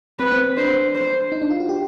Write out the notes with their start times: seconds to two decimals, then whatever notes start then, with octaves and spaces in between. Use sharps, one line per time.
0.19 C4 B4
0.32 C4
0.57 D4 C5
0.95 C5
1.32 D#4
1.42 D4
1.50 F4
1.60 F#4
1.69 G4